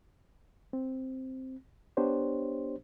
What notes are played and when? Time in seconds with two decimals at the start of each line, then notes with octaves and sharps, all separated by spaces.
0.73 C4
1.97 B3 D4 G4 C5 C#5